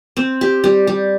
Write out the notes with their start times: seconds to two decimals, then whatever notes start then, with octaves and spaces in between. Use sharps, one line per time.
0.17 C4
0.41 G4
0.64 G3
0.87 G3